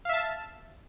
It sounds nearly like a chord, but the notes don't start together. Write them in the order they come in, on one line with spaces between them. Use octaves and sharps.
F5 E5 A5